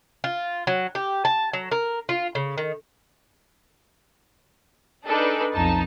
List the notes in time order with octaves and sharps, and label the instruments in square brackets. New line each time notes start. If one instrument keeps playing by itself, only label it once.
[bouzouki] F4
F#3
G4
A5
F#3
A#4
F4
C#3
D#3
[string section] D4 D#4 G#4 A4 B4 D5
B1 F2 D#4 A5